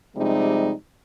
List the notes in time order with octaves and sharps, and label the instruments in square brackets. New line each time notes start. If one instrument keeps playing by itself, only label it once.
[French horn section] C3 F3 G3 G#3 D#4